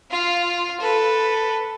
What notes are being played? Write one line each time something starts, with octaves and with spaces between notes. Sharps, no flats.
F4 F5
A4 B4